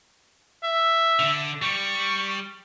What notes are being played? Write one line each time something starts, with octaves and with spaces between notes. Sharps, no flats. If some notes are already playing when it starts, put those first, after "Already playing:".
E5
D3
G3 C#6